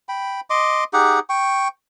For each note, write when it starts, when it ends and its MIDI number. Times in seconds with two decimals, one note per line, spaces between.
0.09 0.40 79
0.09 0.40 83
0.50 0.84 75
0.50 0.84 84
0.50 0.84 86
0.93 1.19 63
0.93 1.19 67
0.93 1.19 68
0.93 1.19 78
1.29 1.68 79
1.29 1.68 85